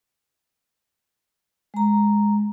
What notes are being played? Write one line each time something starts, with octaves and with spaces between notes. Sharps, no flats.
G#3 A#5